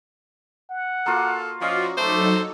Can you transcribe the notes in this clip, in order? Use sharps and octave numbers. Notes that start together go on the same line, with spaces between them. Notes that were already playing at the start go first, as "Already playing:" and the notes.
F#5
A#3 F4 F#4 A4
F3 C#4 F4 F#4 D5 D#5
F#3 A3 D#4 A4 C5 D6 E6